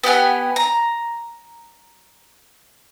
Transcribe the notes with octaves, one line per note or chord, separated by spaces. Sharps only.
B3 G4 F#5 G#5
A#5